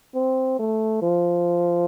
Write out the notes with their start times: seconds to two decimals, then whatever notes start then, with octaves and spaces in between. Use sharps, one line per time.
0.15 C4
0.59 A3
1.02 F3